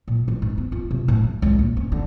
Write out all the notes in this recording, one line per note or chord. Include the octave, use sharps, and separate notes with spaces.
A#2
A1
G#2
B3
F4
C3
A2
A3
C#2
A#1
C#3
D3